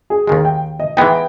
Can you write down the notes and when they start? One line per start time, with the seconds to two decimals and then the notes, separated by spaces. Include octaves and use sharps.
0.10 G#4
0.27 D#2 D#3 G#3 G#4
0.45 G5
0.80 D#5
0.97 E3 G#3 B3 D#4 G5